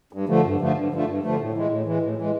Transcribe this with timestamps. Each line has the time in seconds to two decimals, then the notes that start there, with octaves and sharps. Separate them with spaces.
0.13 G2
0.29 D3 F3 A3
0.44 G2
0.60 D3 F3 A3
0.76 G2
0.91 D3 F3 A3
1.07 G2
1.23 D3 F3 A3
1.39 A2
1.54 E3 G#3
1.70 A2
1.86 E3 G#3
2.02 A2
2.17 E3 G#3